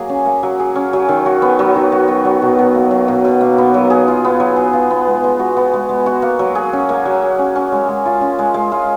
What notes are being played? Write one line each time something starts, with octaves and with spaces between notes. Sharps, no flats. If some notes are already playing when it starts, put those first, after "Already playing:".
Already playing: F#3 A#3 G#4
C#4
A#3
F#3
G#4
C#4
F#3
D#3
F#4
B3
F#3
D#3
F#4
B3
F#3
B2
B2
A#3
F#3
B2
B2
A#3
B3
F#3
G#4
F4
B3
F#3
G#4
F4
B3
G#3
G#3
F#4
B3
G#3
G#3
F#4
A#3
F#3
G#4
C#4
A#3
F#3
G#4
C#4
C#4
G#3
G#3
F4
C#4
G#3
G#3
F4